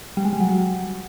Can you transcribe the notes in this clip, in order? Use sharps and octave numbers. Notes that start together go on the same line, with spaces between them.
G3
G#3
G3
F#3